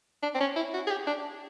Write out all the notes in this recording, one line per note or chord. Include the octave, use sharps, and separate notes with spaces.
D4
C4
C#4
E4
F#4
G#4
G4
D4